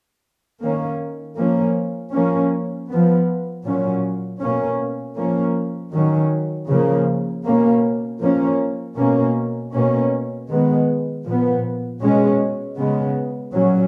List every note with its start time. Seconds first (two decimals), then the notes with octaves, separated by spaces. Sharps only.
0.61 D#3 A#3 C#4
1.37 F3 A#3 C#4
2.12 F3 A#3 C#4
2.89 F3 B3
3.65 A#2 F#3 C#4
4.41 B2 A#3 C#4
5.16 F3 A#3 C#4
5.92 D#3 F#3 C#4
6.68 C#3 F3 A#3
7.45 B2 A#3 C#4
8.20 F3 A#3 C#4
8.96 B2 A#3 C#4
9.73 B2 A#3 C#4
10.49 D#3 G#3 B3
11.25 A#2 F3 B3
12.01 B2 G#3 C#4
12.77 C#3 G#3 B3
13.53 A#2 F#3 C#4